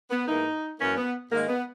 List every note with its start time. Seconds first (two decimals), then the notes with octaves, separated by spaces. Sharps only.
0.10 B3
0.27 G#2 E3 A#3 D#4
0.79 F#2 E3 A#3 C#4
0.97 B3
1.31 G#2 D#3 G#3 A#3
1.48 B3